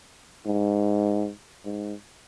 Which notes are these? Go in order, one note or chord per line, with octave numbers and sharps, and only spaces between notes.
G#2
G#2